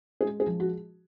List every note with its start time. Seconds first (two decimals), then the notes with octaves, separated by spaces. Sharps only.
0.21 G#3 G#4
0.40 G#4
0.47 F3
0.60 F#4